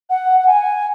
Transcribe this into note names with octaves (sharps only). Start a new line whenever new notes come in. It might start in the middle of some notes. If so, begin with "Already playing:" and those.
F#5
F#5
G#5